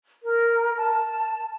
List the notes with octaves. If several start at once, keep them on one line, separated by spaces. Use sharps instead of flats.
A#4
A5